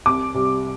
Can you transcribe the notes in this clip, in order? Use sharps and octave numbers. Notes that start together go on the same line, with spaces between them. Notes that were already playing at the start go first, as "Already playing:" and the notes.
C2 D6
C3 G3